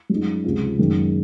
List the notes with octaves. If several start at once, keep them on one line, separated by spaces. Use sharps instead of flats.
F#2 F3 G#3 D#4
C#2 C3 F3 C4 F4
F#1 F#2 D#3 G#3